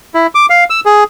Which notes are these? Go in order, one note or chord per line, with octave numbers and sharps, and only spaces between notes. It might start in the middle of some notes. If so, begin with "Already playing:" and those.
E4
D6
F5
E6
G#4